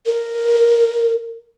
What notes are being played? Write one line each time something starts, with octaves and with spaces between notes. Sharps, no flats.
A#4